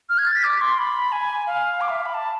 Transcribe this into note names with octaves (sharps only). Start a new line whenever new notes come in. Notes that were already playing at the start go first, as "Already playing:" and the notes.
F6
G#6
A6
B6
D6
C6
B5
G#5
F5
D6
E5
F5
B5
A5